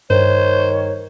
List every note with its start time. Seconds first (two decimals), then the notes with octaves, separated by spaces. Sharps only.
0.10 G2 D#3 C5 C#5